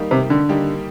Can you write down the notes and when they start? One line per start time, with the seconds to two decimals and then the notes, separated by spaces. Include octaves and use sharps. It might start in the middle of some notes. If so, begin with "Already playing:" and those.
Already playing: D#3 G3 A#3 D#4 G4
0.11 C3
0.30 D3
0.49 D#3 G3 A#3 D#4 G4